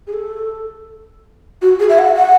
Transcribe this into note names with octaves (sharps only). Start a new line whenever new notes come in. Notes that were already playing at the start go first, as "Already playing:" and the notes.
G#4
A4
F#4
G#4
E5
F#5
F#5